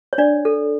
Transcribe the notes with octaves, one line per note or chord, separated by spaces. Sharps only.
C#5
D4 D5
A4